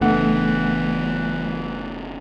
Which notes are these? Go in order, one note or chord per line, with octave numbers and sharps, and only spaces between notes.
F#1 E3 A3 B3 D4 F#5